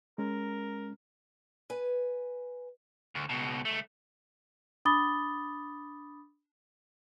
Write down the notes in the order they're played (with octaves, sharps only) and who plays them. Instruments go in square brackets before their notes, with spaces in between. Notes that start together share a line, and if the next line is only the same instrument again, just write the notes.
[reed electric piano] G#3 C#4 [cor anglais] A#4
[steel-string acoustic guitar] B4 G#5
[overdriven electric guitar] D2
C#2 B2
C#2 A3
[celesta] D4 B5 D6 D#6 A6 G7